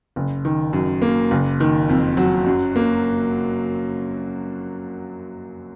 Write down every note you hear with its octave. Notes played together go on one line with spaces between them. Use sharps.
F#1
D#3
F#2
A#3
F#1
D#3
F2
F#3
F#2
A#3